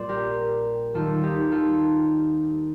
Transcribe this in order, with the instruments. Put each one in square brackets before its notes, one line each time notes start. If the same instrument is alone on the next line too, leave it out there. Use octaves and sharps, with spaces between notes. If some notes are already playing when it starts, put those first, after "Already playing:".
Already playing: [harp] A#1 A#2 G3 C5 D5
G4 A#4
D#2 D#3 G3 F4 A4
D#4 G4
F4 A4